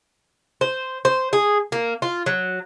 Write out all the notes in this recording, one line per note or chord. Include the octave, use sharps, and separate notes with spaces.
C5
C5
G#4
A#3
F4
F#3